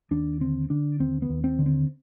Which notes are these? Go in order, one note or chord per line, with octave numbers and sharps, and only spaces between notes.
D#2 D4
D3 C4
D3 D4
D#2 C4
B3
D#2
C4
D3
C4